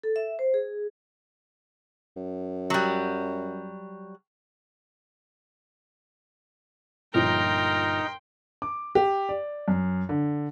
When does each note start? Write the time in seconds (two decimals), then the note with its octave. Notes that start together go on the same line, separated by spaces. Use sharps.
0.04 A4
0.16 E5
0.39 C5
0.54 G#4
2.16 F#2
2.70 F#3 G3
7.14 G1 A#2 F3 D#4 A#4 G5 C6
8.62 D6
8.95 G4
9.29 D5
9.68 F#2
10.09 D3